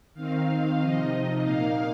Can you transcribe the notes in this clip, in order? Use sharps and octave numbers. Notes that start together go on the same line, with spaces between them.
D#3 C4 D#4 F5
C3 F3 D#4 D#5
A#2 A#3 D#4 F5